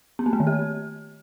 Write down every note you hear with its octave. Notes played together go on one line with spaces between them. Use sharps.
B3
A#3
A3
D#3
G4